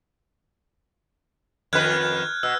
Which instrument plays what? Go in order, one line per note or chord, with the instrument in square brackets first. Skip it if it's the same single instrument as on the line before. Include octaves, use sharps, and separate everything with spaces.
[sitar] F2 D#3 B4 [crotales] F6 F#6 G#6
[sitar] B2 [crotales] E6